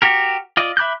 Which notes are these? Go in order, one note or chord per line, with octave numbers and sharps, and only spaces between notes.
F#4 G4 A#4
F4 D5 D#5
E5 B5 D6 F#6 G6